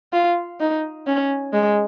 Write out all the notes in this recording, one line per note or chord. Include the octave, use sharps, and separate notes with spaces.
F4
D#4
C#4
G#3